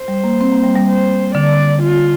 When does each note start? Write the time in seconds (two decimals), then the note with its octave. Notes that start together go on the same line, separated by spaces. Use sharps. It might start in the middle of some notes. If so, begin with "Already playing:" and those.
Already playing: C5
0.08 G3
0.24 A#3
0.41 C4
0.52 A#3
0.64 G3
0.75 G3
0.88 C5
1.35 D3 D5
1.83 F4